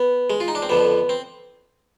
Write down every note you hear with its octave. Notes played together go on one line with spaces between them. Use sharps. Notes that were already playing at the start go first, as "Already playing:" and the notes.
Already playing: B3
G#3
F4
D#4
D4
C4
F2 D3 F3 B3
C4